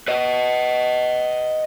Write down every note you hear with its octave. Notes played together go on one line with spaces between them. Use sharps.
B4 D#5